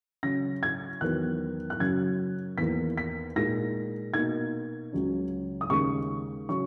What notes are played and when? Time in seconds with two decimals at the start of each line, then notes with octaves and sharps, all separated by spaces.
0.23 C#3 F#3 C#4 A#6
0.63 G#6
1.01 E2 D#3 F#3 B3 F#6
1.70 F#6
1.80 F#2 C#3 F#3 G#6
2.58 E2 D#3 A#3 B6
2.98 B6
3.35 A#2 G#3 D#4 A#6
4.14 B2 A#3 D#4 G#6
4.92 C#2 C#3 F#3 C#4
5.61 D#6
5.70 D#2 C#3 G#3 D#4 C#6
6.49 C#3 F#3 C#4 C#6